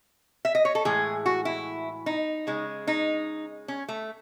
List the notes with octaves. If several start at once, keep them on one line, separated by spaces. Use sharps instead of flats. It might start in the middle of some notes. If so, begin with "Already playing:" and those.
E5
D#5
C#5
A4
A2 E3 G#3 G#4
F#4
E4
D#4
C#3 G#3
D#4
C#4
A3